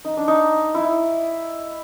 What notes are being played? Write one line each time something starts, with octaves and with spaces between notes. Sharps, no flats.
D#4
D4
D#4
E4